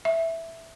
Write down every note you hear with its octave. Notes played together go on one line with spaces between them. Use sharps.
E5